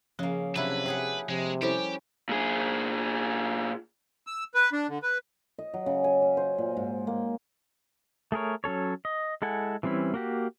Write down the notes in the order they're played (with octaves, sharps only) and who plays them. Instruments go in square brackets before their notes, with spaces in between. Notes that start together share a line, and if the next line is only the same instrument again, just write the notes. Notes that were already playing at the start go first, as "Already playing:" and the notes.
[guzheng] C#3 A#3 [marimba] F3
[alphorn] C3 [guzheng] F#3 D4 E4 [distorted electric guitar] B4
[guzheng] G4 G#4 F#5 [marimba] C#5
[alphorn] C3 [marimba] F3 [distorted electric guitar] G#3
[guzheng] G3 C#4 [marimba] E4 A4 C5 [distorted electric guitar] G4
[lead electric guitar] A#2 G#4
[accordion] E6
B4
D4
D3
B4
[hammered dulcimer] D#5
F#3
C#3
G#5
C#4
C5
A#2
G#2
A#3
[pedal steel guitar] A3 G#4 A#4 C#5
F#3 C#4 A4 C#5
D#5
G#3 E4 A4 F#5 G#5
E3 G3 C4 C#4 E4
A#3 F#4 G4